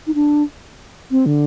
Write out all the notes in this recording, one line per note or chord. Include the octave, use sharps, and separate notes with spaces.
D#4
D4
C4
D3